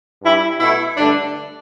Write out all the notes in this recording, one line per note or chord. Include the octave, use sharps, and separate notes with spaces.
G2 G3 E4
B2 A3 E4
G2 D3 A3 D4